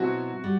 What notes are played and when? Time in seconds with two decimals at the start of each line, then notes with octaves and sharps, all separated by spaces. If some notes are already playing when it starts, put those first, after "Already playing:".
Already playing: B2 F#3 C4 E4 F#4
0.44 G3